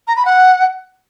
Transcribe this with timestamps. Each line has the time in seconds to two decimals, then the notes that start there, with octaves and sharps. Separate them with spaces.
0.07 A#5
0.16 B5
0.25 F#5